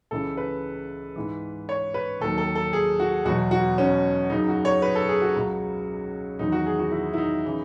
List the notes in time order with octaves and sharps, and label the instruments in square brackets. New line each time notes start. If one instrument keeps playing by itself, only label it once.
[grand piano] C#2 C#3 E3 A4
B4
G#2 E3
C#5
B4
D#2 D#3 F#3 A4
A4
A4
G#4
F#4
E2 B2 F#3 F#4
F#4
C#4
F#2 C#3 F#3 D#4
F#4
C#5
B4
A4
G#4
F#4
C#2 C#3 F#3
E2 D#3 F#3 D#4
F#4
G#4
F#4
E4
E4
D#4
C#3 E3